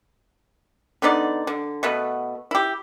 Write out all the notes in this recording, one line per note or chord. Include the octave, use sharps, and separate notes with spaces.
D3 B3 D#4 D5
D3
B2 A3 B3
E4 G4